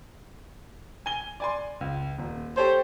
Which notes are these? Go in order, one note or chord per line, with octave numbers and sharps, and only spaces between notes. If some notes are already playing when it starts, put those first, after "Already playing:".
G#5 G7
D5 G#5 C6
C#2
D#1
G4 A4 C5 C#5